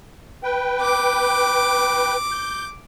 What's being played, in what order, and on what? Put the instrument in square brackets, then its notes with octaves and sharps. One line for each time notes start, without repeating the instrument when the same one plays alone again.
[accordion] B4 G5
[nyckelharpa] D6
[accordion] G6